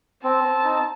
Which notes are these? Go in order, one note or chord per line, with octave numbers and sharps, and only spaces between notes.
C4 A5
C4
D#4